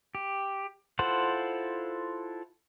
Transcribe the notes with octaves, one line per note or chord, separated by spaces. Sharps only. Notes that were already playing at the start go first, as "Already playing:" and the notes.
G4
E4 F4 A4 C5 F#5